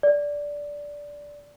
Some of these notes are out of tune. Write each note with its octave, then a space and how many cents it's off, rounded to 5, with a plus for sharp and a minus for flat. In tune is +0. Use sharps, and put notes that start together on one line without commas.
D5 -10